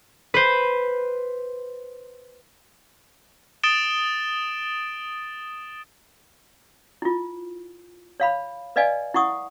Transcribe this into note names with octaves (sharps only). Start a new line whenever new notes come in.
B4 C5
D#6 A6 D7 E7 G7
E4 F4
C#5 F5 B5
B4 D5 D#5 F5 G#5
E4 F#5 C#6 D#6